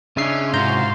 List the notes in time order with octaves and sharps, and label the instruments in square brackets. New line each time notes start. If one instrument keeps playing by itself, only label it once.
[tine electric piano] C#3 E5 C7 [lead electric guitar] C#4 [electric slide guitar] D4 D#5
[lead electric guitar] G#2 [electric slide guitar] C3 E4 F#4 [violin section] F5 C6 [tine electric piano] A#5 G6